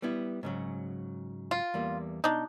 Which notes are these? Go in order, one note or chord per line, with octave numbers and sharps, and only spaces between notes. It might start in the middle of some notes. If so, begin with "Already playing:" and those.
G3 B3 E4
G#2 C#3 F#3
F4
E2 G3 A#3
B2 D4 D#4